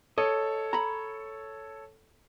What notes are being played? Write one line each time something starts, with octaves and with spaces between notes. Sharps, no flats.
A4 C#5 D#5
A#5 B5